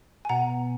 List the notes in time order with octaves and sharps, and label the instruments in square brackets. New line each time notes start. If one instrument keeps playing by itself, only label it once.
[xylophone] G#5
[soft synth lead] B2 [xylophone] F#5 A#5